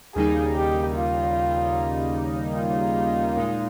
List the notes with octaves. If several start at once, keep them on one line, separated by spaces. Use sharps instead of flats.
D#2 C#3 G3 A#3 D#4 G#4
G4
F4
F4
A#2 G#3 D#4